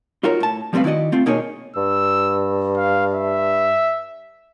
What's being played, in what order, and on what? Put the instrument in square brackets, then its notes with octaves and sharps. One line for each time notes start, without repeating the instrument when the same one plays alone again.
[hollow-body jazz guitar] D#4 F4 F#4 A#4 C#5
A2 A5
F3 G3 A3 C4 B4 F5
D#3 E4 F#4 D5 D#5
A3 C4 F4
B2 A#3 D#4 G#4 C#5
[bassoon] G2 [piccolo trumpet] E6
[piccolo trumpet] F5
E5